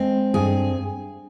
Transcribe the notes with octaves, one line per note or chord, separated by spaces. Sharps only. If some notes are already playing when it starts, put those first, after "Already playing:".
Already playing: G#3 C4
G2 G#4